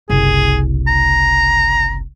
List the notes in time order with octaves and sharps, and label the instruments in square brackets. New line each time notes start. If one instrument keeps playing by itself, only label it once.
[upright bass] F#1 C2 [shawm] G#4
[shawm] A#5